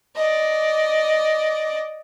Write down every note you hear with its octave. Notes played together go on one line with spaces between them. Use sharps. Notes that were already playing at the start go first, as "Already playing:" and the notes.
D5 D#5